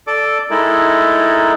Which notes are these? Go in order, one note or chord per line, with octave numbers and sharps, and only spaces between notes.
A4 D5 D6
G#3 D#4 E4 A4 A#4